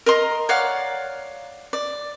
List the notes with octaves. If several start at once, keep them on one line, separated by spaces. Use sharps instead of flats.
A#4 D#5 A#5 C6
C#5 D5 F5 F#5
D5